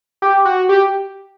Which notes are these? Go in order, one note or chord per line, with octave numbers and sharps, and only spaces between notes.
G4
F#4
G4